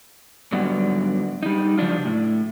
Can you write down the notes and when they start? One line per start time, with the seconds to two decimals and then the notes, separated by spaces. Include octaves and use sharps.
0.52 G#2 D3 F#3 G3 B3 D5
1.43 G3 D#4
1.78 C#3 F3 F#3 D4 F4
2.05 A2